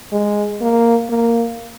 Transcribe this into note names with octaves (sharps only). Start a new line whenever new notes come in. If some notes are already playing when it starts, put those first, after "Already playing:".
G#3
A#3
A#3